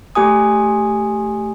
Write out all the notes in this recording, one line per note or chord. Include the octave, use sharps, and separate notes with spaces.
A3 G4 G#5 D#6